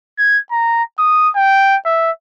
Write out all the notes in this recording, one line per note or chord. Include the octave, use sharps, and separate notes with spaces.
G#6
A#5
D#6
G5
E5